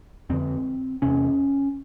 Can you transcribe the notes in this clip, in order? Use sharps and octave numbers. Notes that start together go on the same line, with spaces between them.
F2 D3 C4
E2 C3 C#4